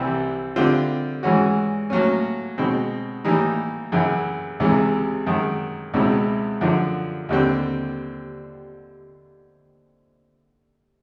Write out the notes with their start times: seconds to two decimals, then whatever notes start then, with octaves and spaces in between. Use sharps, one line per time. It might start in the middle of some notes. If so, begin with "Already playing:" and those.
Already playing: C2 C3 E3 G3 C4
0.56 D3 G3 C4 F4
1.23 G#2 E3 G#3 C#4 F#4
1.90 A2 F#3 A#3 C#4
2.58 B2 G#3 C4
3.25 A2 E3 G3 A#3 D#4
3.92 F#2 C#3 E3
4.60 C#2 C3 E3 G#3
5.27 F#2 D#3 G#3
5.94 C#2 B2 G#3 C4 E4
6.61 F#2 D3 F3
7.29 D#2 D3 G3 C4